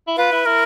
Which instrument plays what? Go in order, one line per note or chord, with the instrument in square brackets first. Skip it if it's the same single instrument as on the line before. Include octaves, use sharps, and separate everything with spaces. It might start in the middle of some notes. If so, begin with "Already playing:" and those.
[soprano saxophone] E4
[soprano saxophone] F4 [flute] B4
[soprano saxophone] E4
[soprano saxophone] E4 [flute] A#4